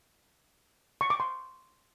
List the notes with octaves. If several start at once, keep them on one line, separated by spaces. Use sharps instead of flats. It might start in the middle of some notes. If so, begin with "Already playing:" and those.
C#6
D6
C6